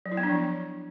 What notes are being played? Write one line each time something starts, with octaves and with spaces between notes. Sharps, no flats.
F#3
E4
B3
D4
F3